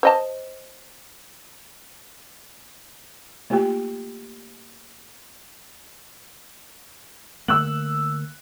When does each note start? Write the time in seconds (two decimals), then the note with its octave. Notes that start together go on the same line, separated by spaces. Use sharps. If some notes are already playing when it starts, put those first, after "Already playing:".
0.03 C5 D#5 A5
3.50 A3 A#3 F4 G4 G5
7.48 D3 A3 A#3 E6 F#6 F#7